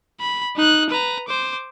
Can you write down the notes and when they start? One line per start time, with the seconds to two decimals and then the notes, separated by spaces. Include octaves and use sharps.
0.20 B5
0.56 D#4 F#6
0.90 B4 A#5
1.28 C5 D6